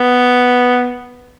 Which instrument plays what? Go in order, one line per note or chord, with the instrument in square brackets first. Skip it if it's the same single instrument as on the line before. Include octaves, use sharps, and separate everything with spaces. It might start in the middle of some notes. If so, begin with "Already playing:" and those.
Already playing: [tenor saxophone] B3